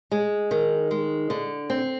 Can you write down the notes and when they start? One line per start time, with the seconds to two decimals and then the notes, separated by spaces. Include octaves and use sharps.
0.12 G#3
0.51 D#3
0.91 G#3
1.30 D3
1.70 C4